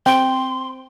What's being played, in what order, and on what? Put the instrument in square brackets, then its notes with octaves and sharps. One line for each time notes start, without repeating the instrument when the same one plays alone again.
[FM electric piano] C4 [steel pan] G5 [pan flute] C6